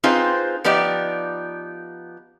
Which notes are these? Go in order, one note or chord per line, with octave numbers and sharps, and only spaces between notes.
C4 D#4 F4 G#4 B4 C5
F3 B3 D#4 G4 D5